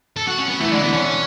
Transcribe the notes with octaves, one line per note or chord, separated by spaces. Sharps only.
A4
F#4
C#4
B3
E3 A3 E4
D3 G#3 D4
E3 B3 E4
D3 C#4 D4